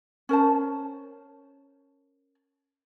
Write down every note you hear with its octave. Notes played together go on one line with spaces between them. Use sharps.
C#4 A#4 C5 A5